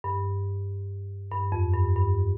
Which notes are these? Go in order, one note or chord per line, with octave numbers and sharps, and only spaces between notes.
G2
G2
F2
G2
G2